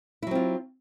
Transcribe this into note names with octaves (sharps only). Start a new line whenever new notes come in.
F#3 C4 E4 F4